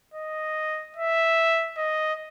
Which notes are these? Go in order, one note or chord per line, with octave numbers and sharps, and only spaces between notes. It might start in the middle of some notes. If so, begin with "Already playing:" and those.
D#5
E5
D#5